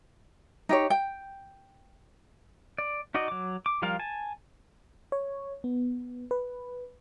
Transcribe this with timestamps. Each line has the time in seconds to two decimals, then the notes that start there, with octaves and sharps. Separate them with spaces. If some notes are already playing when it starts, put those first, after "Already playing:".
0.69 D#4 G4 C#5
0.90 G5
2.78 D5
3.14 D#4 F#4 D5 D#5
3.28 F#3 D6
3.66 D6
3.82 F3 G3 F4 A#4 F5
3.99 G#5 A5
5.12 C#5
5.64 B3
6.31 B4